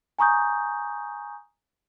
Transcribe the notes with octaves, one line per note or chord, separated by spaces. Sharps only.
G#5 A#5 C#6 D#6 G6